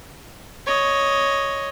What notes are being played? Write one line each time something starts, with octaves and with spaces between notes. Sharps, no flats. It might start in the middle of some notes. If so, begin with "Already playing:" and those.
C#5 D#5